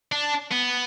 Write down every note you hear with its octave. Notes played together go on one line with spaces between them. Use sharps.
D4
B3